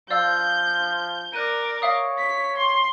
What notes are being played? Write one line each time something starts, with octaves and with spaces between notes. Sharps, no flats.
F3 D5 F5 E6 G6
A#4 D5 F#6 D#7
C#5 E5 F5 D#6
B6
C6